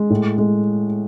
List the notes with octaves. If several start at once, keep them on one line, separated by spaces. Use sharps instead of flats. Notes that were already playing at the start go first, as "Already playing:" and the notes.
Already playing: G#3
A2
G#3